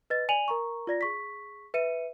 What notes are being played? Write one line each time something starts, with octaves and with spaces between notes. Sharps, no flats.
B4 D#5 A6
D5 G#5 D#7 F7 F#7
A#4 A#5 C#6
F4 D5 A#6
G#4 C#6 B6
B4 E5 C#7 D#7